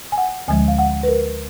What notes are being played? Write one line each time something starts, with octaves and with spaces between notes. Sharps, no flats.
G#5
F#5
D2 D3 F3 G#3 G#5
F5
F#5
B4
A#4